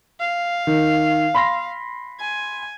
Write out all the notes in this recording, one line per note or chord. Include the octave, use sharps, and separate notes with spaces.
F5
D#3
B5 C6 A#6
G#5